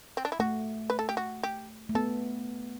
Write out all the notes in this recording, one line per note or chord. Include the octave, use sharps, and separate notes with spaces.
C4
D4
E4
A3 F#4
B4
A4
G4
F#4
G4
A3
B3 A4